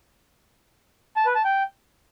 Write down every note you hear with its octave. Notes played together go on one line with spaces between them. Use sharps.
A5
B4
A5
G5